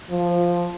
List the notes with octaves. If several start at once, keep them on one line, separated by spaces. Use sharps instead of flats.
F3